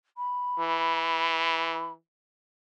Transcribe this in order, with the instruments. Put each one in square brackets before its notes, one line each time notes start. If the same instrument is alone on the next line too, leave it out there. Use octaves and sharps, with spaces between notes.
[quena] B5
[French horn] E3